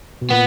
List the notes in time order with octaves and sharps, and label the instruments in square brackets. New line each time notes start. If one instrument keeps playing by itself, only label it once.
[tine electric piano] B2
[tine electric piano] A#2 [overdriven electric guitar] B3